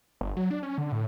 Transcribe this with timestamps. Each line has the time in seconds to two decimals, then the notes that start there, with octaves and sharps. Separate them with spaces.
0.21 G1
0.37 F#3
0.51 D4
0.63 C#4
0.78 D3
0.92 A2